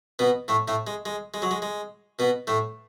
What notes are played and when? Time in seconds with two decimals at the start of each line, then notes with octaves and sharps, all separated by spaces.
0.19 B2 B3
0.48 A2 A3
0.68 A2 A3
0.87 G#3
1.06 G#3
1.34 G#3
1.42 F#3
1.51 G#3
1.62 G#3
2.19 B2 B3
2.47 A2 A3